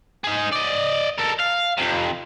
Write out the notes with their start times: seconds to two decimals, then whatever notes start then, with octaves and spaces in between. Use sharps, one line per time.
0.24 D#4 G#4
0.53 D5 D#5
1.18 A4 A#4
1.39 F5
1.78 F2 C3